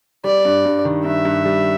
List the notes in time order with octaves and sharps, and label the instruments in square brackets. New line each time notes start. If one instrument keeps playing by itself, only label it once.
[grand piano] G3 [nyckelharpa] D5
[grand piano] G2
G2
D#3
[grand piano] G2 [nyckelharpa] E5
[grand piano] G2
G3